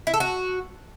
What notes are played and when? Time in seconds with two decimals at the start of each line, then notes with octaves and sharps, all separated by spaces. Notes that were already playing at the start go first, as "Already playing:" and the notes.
0.07 E4
0.14 A4
0.20 F#4